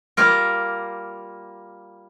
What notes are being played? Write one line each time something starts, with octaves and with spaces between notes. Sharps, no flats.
G3 A#3 F4 A#4